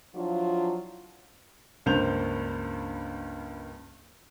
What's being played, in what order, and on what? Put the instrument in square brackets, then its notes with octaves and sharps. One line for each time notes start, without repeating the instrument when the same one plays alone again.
[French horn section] F3 F#3 D4 E4 F4
[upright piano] C#2 G2 A#3 C5 G6 F7